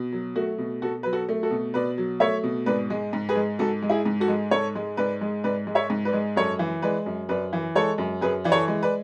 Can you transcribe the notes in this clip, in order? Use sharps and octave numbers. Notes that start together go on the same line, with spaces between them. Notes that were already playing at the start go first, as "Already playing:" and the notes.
Already playing: B2
F#3
A3 F#4
B2
B2 F#4 A4
F#3 B4
F#4 A4
A3
F#4 A4
B2
B2 B4 D5
F#3
A3 C#5 E5
B2
G#2 B4 D5
G#3
G#2
G#4 B4
G#3
G#2 F#4 A4
G#3
E4 G#4
G#2
F#4 A4
G#3
G#2 A4 C#5
G#3
G#2 B4 D5
G#3
G#2 B4 D5
G#3
C#5 E5
G#2
B4 D5
G#3
F#2 A4 C#5
E3
G#3 B4 D5
F#2
F#2 B4 D5
E3
G#3 A4 C#5
F#2
F#2 G#4 B4
E3 D5
A4 C#5
G#3
B4 D5